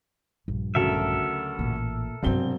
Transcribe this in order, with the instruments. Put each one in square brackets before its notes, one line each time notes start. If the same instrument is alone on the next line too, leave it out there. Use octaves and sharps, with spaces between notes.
[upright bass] A#1 [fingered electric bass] G2
[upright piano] D2 C#3 F#3 [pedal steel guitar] A4 A#4 E5
[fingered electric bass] A1 [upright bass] A#2 A#3
[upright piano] E1 C4 G7 [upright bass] G2 C3 [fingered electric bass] F#3